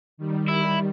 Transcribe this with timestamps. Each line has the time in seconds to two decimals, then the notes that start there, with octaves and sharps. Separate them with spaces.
0.18 D#3 G3
0.49 E4